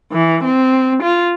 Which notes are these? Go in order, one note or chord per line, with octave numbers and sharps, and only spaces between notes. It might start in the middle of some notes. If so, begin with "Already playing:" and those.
E3
C4
F4